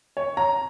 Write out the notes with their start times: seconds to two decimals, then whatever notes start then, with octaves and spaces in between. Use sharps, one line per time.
0.17 C#5
0.37 A#5